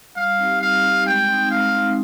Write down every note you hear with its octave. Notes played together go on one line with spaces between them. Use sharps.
G3 F5
C4 D#4 G4
G3 F5
C4 D#4 G4
G#3 G5
C4 D#4
G#3 F5
C4 D#4